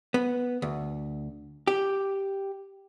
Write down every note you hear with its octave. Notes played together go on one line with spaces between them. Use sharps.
B3
D2
G4